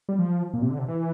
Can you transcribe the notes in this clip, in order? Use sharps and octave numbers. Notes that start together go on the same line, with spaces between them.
G3
F3
A#2
C3
D3
C3
E3